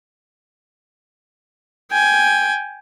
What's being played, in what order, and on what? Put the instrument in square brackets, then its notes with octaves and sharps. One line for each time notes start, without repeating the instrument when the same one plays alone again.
[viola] G5 G#5